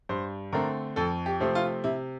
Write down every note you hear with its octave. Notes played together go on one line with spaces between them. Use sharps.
G2 C5
D3 A3 C4 A#4
F2 A4
G4
C3 F3 A3 C4
F4
C3 E4